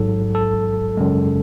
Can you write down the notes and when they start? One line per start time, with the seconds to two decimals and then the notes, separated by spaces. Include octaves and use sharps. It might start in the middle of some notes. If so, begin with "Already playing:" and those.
Already playing: A1 G#2 F#3 A4
0.35 A4
0.97 F#2 C#3 G#3